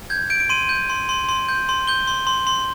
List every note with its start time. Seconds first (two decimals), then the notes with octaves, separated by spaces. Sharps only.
0.10 G6 G#6
0.30 G6 D7
0.40 D7
0.50 C6 D#7
0.69 G6
0.90 C6
1.09 C6
1.29 C6
1.49 G6
1.69 C6
1.87 G6 G7
2.07 C6
2.27 C6
2.47 C6